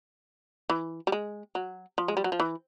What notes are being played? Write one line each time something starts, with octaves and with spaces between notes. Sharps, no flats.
E3
G3
G#3
F#3
F3
G#3
G3
F#3
F3
E3